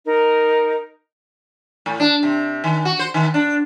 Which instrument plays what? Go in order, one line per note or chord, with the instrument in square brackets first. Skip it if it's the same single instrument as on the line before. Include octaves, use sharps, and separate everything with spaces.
[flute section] D#4 A#4
[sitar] A2
D4
C3
D#3
F#4
C5
D#3
D4